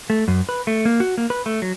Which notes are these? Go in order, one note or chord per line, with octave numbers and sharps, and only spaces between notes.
A3
F#2
B4
A3
A#3
F#4
A#3
B4
A3
F#3